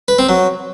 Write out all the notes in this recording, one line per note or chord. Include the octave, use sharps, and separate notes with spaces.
B4
C4
F#3